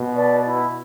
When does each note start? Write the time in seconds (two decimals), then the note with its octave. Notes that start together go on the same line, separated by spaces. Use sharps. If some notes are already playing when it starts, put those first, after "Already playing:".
Already playing: B2
0.14 B4 D5 A5
0.42 E4